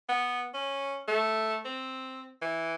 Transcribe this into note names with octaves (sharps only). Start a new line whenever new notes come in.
B3
C#4
A3
C4
E3